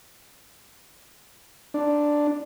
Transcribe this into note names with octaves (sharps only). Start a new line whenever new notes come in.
D4